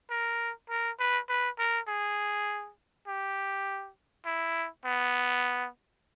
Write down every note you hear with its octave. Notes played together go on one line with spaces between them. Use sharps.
A#4
A#4
B4
B4
A#4
G#4
G4
E4
B3